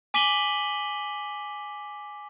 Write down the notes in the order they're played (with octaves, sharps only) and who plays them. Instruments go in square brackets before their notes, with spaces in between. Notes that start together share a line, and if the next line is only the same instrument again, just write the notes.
[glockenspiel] G#5 D6 B6 D#7 F#7 G7